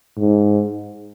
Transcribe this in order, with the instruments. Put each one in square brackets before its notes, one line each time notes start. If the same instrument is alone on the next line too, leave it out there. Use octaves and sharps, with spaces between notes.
[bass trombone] G#2